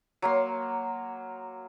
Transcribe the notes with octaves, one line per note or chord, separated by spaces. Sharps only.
F#3 A#3 C6